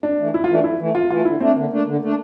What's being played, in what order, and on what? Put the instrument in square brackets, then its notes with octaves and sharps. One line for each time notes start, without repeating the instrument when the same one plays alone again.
[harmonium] F2 [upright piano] D4
[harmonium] E3 A3
[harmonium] F2 [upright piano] E4
[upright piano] F4
[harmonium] E3 A3 [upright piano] D4
[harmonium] F2 [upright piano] E4
[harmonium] E3 A3
[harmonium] F2 [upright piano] F4
[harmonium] E3 A3 [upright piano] F4
[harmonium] D3 [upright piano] E4
[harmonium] A3 D4 [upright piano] C4
[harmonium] D3 [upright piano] A#3
[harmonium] A3 D4
D3
A3 D4